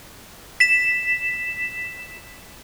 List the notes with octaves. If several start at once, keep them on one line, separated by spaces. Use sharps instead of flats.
B6 E7